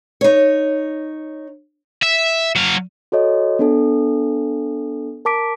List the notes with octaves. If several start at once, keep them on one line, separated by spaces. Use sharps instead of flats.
D#4 C#5
E5
F#3 F5
F#4 A4 C#5 D#5
B3 D4 A4
A#4 A5 D6 B6 D7